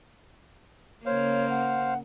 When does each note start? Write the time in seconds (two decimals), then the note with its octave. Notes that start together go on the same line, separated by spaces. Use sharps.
1.06 C#3 A#3 C5 C#5 F5
1.50 F#5